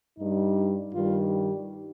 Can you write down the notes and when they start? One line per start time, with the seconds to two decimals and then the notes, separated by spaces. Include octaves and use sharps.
0.18 G2 G3 D#4
0.92 G2 D#3 G3 F4
1.29 G4